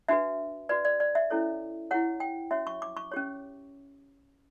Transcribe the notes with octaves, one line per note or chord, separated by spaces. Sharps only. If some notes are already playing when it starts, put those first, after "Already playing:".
D4 F#4 B4 E5
F#4 B4 D5
D5
D5
E5
C#4 E4 A4 C#5
E4 G4 C#5 F#5
G5
C#4 F#4 C#5 E5
C#6
D6
C#6
C#4 G4 C#5